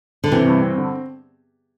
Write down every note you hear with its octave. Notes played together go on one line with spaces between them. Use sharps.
D3
C3 E3
G2
C4
D3